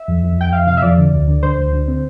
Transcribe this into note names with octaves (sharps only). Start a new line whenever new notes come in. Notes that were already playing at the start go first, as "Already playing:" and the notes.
Already playing: E5
F2
F2
F2 G5
F2 F5
C3 F5
E5
F2 D5
D3
D2
D3
D3 C5
D2
D3
C4